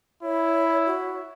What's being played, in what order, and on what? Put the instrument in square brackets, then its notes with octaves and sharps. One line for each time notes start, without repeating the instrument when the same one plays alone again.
[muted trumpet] E4 [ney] C#5
[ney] F#4